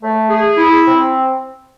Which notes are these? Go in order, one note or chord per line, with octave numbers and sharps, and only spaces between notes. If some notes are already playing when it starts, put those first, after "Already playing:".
A3
G#4
E4
C4